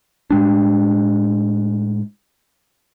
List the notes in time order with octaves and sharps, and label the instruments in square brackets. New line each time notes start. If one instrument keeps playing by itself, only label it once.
[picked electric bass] A2 G#3 D4